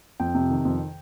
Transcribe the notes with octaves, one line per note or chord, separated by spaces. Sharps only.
F2 G5
C3
D#3
F2